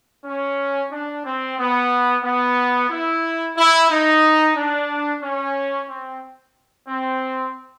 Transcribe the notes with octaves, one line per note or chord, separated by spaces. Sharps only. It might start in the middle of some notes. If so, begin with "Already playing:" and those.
C#4
D4
C4
B3
B3
E4
E4
D#4
D4
C#4
C4
C4